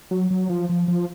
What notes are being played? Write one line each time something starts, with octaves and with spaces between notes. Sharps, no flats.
F#3
F#3
F3
F3
F3